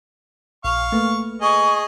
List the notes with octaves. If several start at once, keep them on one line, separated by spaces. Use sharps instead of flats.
A#1 F5 C#6
A3 A#3 B4
G#4 D#5 C#6